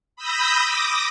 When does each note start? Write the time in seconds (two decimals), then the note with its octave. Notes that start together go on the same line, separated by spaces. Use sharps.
0.16 B5 D#6 E6 G6 A#6
0.62 D6 D#6 A#6